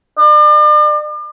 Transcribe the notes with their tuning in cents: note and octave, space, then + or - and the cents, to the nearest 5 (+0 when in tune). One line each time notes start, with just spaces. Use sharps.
D5 +40